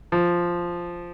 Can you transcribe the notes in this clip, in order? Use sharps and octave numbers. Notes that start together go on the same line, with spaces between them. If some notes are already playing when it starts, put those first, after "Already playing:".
F3